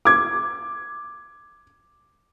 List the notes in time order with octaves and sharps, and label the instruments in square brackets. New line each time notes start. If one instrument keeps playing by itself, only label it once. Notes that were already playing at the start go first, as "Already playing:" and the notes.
[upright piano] D6 G#6